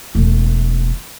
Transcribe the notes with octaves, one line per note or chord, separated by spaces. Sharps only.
E1 A3